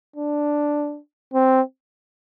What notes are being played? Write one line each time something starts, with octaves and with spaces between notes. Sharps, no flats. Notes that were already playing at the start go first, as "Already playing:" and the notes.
D4
C4